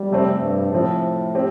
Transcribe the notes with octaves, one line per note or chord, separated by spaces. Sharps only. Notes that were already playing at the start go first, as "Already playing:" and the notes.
Already playing: G3
F2 C3 A3 C4
G2
A2 F3 C4 F4
C4 G4